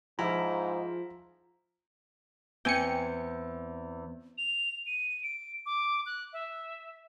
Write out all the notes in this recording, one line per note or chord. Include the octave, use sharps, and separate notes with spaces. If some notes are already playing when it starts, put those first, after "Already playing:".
G#2 F3 E4 A#5
E2 C4 G5 G#5 C#7
F7
D#7
D7
D6
F#6
E5